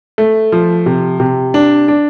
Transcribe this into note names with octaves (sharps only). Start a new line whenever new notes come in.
A3
F3
C3
C3
D4
D4